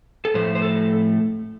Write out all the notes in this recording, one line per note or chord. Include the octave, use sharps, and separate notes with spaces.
A4
A2 F3 A3 C5
C5
A4